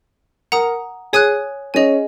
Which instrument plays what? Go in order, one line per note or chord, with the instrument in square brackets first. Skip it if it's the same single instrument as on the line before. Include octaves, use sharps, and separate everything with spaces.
[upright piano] A#4 [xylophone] F#5 A#5 D#6
[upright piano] G#4 [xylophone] C#5 G#5 D#6 F#6
[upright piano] C#4 [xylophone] G#4 D#5 G#5